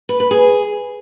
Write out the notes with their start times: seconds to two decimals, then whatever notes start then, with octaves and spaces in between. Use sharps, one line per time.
0.09 B4
0.20 B4
0.31 G#4